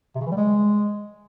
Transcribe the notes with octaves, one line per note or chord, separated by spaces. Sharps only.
C3
C#3
E3
G3
G#3